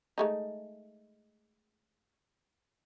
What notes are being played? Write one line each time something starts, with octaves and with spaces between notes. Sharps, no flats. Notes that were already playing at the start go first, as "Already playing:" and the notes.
G#3 A3 D#4